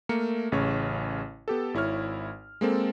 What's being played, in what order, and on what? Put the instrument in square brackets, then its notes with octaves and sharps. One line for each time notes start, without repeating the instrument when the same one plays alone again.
[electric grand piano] A3 A#3 A#4 C#7
A1 C#3 C#5
B3 G4 A4
G#1 E4 C#5 F6
G#3 A#3 C4 A4